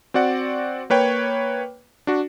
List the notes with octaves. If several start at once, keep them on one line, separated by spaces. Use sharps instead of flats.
C4 F#4 D5 F#5
A#3 B4 C#5 G5
D4 F#4